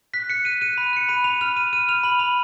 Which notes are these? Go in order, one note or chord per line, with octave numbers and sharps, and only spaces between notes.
F#6 B6
F#6 C#7
F#6 D#7
F#6 D#7
B5
F#6 C#7
B5 D#7
B5 F7
F6 F7
B5 D#7
F6 D#7
F6 F7
B5 F#7
B5 F7